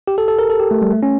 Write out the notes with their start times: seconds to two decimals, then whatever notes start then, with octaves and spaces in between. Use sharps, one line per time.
0.08 G4
0.18 A4
0.28 A4
0.39 A#4
0.50 A4
0.60 G4
0.71 A3
0.82 G3
0.92 A3
1.03 C#4